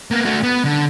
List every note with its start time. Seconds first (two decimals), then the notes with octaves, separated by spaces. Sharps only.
0.11 A#3 B3
0.25 A3 F#4
0.43 B3
0.65 D3